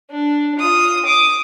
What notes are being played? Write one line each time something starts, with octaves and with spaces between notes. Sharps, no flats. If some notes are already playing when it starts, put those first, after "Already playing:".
D4
F4 D#6
D6 D#6